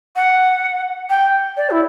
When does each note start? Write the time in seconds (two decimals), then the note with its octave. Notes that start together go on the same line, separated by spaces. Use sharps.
0.16 F#5
1.10 G5
1.57 D5
1.70 E4